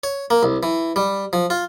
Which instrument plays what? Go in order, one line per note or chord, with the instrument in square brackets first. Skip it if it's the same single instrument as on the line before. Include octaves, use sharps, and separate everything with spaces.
[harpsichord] C#5
A#3
C2
E3
G3
F3
F4